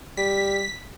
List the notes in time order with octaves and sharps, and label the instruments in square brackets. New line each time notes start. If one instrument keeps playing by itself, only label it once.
[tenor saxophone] G3 [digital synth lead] B6